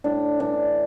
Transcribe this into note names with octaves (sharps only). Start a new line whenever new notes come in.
A2 D4
E3 D4